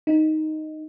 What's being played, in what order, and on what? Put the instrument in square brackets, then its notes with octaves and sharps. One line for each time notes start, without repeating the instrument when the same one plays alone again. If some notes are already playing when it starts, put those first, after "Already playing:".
[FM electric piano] D#4